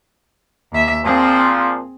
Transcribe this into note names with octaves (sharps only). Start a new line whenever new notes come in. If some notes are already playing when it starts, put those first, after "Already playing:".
D#2 E5
A#2 F3 C4 G#4